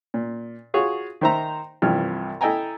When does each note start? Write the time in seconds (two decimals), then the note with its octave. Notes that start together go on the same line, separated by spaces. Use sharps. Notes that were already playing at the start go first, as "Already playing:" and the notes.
0.14 A#2
0.74 F4 F#4 G#4 C#5
1.21 D#3 D#4 C5 E5 A#5
1.82 C2 G2 E3 F3 C4 F6
2.41 E4 A4 D#5 G5 G#5 A#5